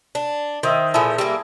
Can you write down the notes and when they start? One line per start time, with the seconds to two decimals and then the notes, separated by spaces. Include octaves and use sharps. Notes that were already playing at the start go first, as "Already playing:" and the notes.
0.15 D4
0.63 D#3 C5 D#5 E5
0.94 A#2 F3 E4 G#4 A4
1.18 G3 A#3